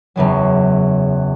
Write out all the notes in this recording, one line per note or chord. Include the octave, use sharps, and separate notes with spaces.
F#1 E2 C#3 F#3